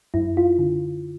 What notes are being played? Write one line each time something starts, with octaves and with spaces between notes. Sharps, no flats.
F#2 E4
F4
D3